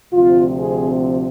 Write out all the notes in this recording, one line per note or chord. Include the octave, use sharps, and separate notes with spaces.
D2 C3 F3 C4 F4
G#4